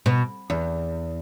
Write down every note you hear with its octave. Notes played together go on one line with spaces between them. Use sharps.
B2
E2